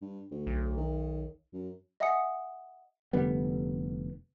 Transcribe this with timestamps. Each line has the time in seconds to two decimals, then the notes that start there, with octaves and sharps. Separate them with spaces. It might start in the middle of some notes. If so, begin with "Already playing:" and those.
0.02 G2
0.31 D2
0.47 B1
0.77 D#3
1.53 F#2
2.00 D#5 E5 F#5 G#5 D#6 C#7
3.13 F1 D3 G3 B3